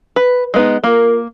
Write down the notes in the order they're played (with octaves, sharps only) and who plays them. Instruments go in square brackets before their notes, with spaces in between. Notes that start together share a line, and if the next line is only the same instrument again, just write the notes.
[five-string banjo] B4
G#3 B3 D#4
[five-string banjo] A#3 [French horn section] F4 A#4